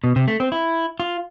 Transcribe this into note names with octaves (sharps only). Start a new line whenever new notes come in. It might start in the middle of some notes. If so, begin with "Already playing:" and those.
B2
C3
A3
C4
E4
F4